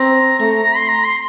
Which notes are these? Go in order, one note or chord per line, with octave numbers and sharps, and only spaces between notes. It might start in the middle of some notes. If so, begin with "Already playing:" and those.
Already playing: C4 A#5
A3 A#5
A#5
A#5
C6
A#5
C6